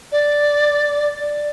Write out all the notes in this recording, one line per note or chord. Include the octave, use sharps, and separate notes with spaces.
D5
D5